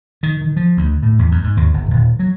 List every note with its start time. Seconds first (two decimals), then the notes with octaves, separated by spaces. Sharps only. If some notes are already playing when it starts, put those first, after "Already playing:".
0.23 D#3
0.41 D#3
0.57 F3
0.77 D2
1.03 A2
1.19 E2
1.32 F#2
1.44 G#2
1.57 D#2
1.74 G1
1.91 D#1
2.20 F#3